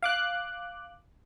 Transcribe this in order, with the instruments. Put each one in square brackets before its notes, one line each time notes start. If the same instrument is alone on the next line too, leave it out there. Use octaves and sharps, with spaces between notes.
[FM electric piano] F5 D6 F#6